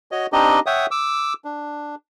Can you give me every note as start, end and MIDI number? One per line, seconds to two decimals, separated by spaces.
0.12 0.26 66
0.12 0.26 73
0.12 0.26 75
0.33 0.60 60
0.33 0.60 62
0.33 0.60 63
0.33 0.60 67
0.33 0.60 75
0.66 0.86 73
0.66 0.86 76
0.66 0.86 78
0.66 0.86 79
0.66 0.86 87
0.91 1.34 86
0.91 1.34 88
1.45 1.95 62